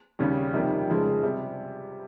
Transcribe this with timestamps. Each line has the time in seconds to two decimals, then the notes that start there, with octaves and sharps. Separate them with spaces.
0.19 D#2 C#3 G3 C#4
0.54 F2 C3 D#3 G3 A#3
0.88 F1 F2 C#3 G#3
1.23 C3 G3